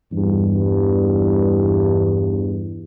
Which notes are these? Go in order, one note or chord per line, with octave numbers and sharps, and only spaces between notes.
E2 G2